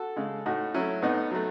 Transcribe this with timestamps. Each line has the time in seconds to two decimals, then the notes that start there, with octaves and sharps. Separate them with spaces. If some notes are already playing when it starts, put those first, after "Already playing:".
Already playing: F#4 A4
0.16 C#3 G#3
0.46 A2 D#4 F#4
0.74 F#3 A3 C#4 E4
1.02 A2 B3 D#4
1.31 F#3 A3